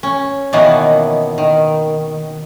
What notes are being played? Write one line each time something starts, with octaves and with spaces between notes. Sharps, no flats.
C#4
B2 D#3 E3 A#3 B3 C#4
D#3